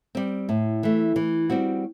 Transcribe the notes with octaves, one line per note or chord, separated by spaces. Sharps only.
G3 C4
A2
E3 A3
E3
G3 C4 F#4